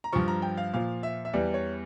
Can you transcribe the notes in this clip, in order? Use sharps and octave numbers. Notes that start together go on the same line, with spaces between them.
A#5
G2 F3 C#6
A#5
G5
F5
A#2 F3 F5
E5
E5
E2 E3 G3 D5
C#5